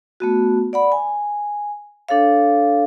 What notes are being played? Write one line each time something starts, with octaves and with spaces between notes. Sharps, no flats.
A3 B3 F#4
D5 F#5 B5
G#5
D4 A4 C#5 F5